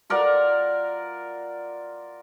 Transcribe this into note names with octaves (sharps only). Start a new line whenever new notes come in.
F4 A#4 D5 F#5